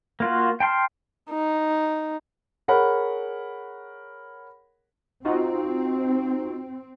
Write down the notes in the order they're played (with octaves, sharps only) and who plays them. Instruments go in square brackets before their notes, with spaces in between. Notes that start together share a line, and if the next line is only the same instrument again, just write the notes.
[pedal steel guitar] A#3 F4 F#4
G5 A5 C6 F6
[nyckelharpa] D#4
[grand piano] G#4 A#4 C#5 F#5 B5
[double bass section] C4 [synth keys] D#4 F4 F#4